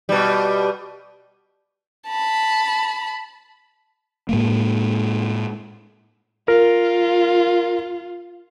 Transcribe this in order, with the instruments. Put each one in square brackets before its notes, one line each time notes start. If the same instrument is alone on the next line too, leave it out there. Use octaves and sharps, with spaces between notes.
[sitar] B2 G3
[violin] A5 B5
[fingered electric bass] A2 G#3 A#3
[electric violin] F4 [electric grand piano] A#4